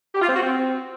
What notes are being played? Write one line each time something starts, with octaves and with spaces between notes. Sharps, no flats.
G4
F4
C4
F#4
C4